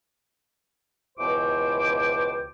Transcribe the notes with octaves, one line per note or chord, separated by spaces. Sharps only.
C#2 B2 E3 C5 G5 D6